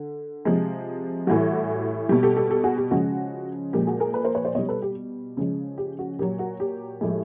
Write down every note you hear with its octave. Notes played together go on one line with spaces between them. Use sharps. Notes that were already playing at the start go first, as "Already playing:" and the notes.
Already playing: D3
C3 F3 G#3
A2 E3 G3 F#4
B2 G3 G4
G4 A4
G4 A4
G4 A4
F#4 G#4
G4
C#3 F3 G#3 F#4
A#2 F3 G#3 G4
F#4 G#4
G#4 A#4
A4 B4
A#4 C5
B4 C#5
C5 D5
B2 G3 C#5 D#5
A4 B4
G4
C#3 F3 G#3
G4
F#4
A#2 F#3 G4
F#4
G4
A2 F3 G#3